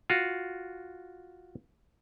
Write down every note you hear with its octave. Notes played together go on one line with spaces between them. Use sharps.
F4 F#4